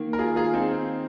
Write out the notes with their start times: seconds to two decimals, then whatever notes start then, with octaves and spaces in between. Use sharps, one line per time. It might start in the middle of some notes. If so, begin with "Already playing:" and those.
Already playing: D#3 A#3
0.13 A#4
0.19 F4 G#4
0.36 F4 G#4
0.53 C4 D#4